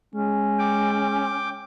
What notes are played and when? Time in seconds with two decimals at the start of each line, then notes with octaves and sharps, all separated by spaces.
0.14 G#3 C#4
0.59 G5 D6